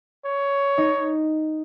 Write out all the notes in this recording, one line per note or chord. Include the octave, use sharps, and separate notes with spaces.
C#5
D#4